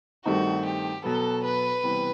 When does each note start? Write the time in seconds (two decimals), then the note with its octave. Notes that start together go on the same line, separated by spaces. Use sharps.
0.25 G2 D#3 A3 C4 D#4 F#4
0.65 G4
1.04 B2 F#3 B3 A4
1.44 B4
1.83 C3 E3 G3 B3